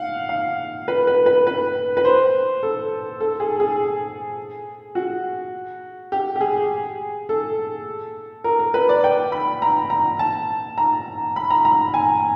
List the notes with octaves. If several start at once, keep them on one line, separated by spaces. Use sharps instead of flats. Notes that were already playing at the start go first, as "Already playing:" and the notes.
Already playing: F5 F#5
F5
B4
B4
B4
B4
B4
C5
A4
A4
G#4
G#4
F#4
G4
G4
G#4
A4
A#4
A#4
B4
D5
G5
B5
A#5
A#5
A5
A#5
B5
A#5
A#5
G#5